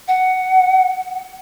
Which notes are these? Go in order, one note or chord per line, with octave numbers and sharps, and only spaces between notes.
F#5